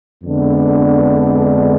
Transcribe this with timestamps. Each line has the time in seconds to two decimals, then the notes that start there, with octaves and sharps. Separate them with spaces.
0.24 F2 D3 G#3 B3 D4